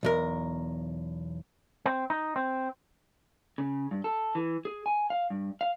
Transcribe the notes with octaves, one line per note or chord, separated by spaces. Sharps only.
B1 E2 A#4
C4
D#4
C4
C#3
G2
A4
E3
G#4
G#5
F5
G2
F5